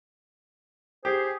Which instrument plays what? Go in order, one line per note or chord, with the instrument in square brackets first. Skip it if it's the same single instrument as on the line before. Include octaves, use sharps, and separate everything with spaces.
[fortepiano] G4 [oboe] G#4 [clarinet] C5